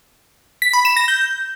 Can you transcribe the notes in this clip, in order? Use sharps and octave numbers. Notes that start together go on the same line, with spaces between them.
B6
B5
E7
A#6
G6